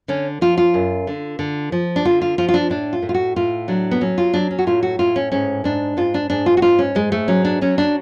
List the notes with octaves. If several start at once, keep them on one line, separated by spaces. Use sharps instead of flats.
D3 C#4
F3 F4
F4
F#2
D3
D3
F3
D4
D3 F4
F4
F3 F4
F4
D4
A2 D4
F4
A2
F4
F#4
A2 F4
F#3 D4
B3
F#3 C#4
F4
F#3 D4
C#4
F#4
A2 F4
F#4
A2 F4
C#4
G#2 C#4
G#2 D4
G#2 F4
D4
G#2 D4
F4
F#4
G#2 F4
C#4
G#2 G#3
A3
F#3 C#4
D4
F#3 C#4
D4